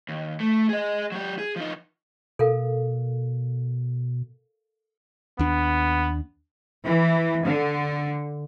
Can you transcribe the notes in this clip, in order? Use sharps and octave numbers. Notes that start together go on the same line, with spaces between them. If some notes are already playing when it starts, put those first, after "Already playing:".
D#2
A3
G#4 D#5
F#3 G4
G#4
F3 D#4
B2 A4 A#4 F5
D#2 B3 D4
E3
D3